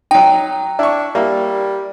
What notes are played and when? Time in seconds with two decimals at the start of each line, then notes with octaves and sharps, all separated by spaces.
0.11 F#3 D#4 G5
0.79 D4 E4 C#6
1.15 G3 A#3 E4